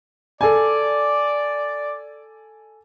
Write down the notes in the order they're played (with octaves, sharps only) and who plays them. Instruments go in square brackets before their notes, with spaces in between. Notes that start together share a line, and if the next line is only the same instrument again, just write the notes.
[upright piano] A4 G#5 [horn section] D5